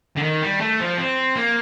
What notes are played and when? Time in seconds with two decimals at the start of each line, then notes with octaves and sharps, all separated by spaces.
0.17 D3
0.23 D#3
0.43 G3
0.60 A3
0.80 F3
0.98 C4
1.36 A#3